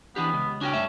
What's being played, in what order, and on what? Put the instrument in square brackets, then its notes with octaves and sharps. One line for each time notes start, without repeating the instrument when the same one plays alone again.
[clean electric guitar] E3 D4 G4 [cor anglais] B3
[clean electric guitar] C#2
[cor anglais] C#4 [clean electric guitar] D4 F#4 G5
[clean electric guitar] G2 A3 E5